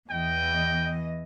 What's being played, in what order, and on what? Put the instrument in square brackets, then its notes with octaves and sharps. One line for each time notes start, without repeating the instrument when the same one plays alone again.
[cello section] E2 E3 D#5 [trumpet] G5